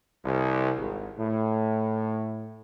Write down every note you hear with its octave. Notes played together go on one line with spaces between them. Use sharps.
C2
G#1
A2